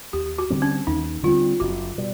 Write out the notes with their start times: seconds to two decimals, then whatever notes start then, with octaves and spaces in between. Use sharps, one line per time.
0.13 D#2 G4
0.38 F#4
0.50 D3 G3 C4
0.62 C#4
0.87 D#2 D#4
1.23 D3 G3 C4 F4
1.60 F#1 F#4
1.98 B2 G3